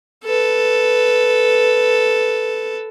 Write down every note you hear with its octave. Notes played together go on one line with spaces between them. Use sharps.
A4 B4